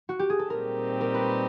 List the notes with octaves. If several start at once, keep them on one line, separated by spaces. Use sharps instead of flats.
F#4
G4
G#4
A4
A#2 G3 C4 D#4 G4 A#4
A#4
B4